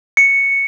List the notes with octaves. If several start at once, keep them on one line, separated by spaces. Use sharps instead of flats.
C#7